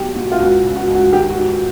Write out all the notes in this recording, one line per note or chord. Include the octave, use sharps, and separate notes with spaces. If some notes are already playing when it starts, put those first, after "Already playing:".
Already playing: B1 F#3 G4
A#2 F#4
F4
C#2 F#4
C#3
F#4
C#2
F#4
D#3 G4
F#4
G#2
F#4